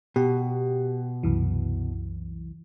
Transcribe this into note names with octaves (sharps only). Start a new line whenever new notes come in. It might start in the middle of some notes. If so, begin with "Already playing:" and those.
B2 G4
C2 F#2 E3